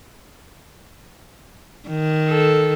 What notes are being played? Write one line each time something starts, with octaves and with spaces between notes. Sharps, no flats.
D#3
A4